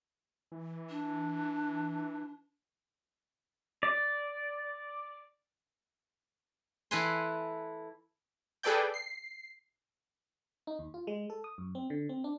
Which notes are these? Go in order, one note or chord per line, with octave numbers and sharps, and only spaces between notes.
E3
D4
D5
E3 A4 B4 G#5 C6
G#4 A4 B4 D5 G5 G6
C7
D#4
D#2
F4
G#3
A4
D#6
F#2
C4
D3
C4
D4